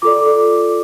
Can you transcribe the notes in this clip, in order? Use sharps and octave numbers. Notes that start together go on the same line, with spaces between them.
F4 A4 D5 D6